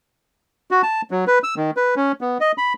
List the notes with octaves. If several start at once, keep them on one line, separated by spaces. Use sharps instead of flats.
F#4
A5
F#3
B4
E6
D#3
B4
C#4
B3
D#5
B5